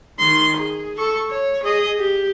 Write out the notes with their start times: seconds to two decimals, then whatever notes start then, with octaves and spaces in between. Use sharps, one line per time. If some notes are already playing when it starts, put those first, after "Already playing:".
0.19 D#3 C6
0.56 G#4
0.98 A4 C#6
1.30 C#5
1.63 G#4 D#5
1.99 G4